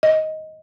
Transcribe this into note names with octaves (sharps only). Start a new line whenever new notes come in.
D#5